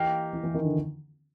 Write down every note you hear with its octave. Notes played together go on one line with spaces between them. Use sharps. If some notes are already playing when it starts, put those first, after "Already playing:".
Already playing: E3 A#3 D#4 G4
E3
E3
D#3
D3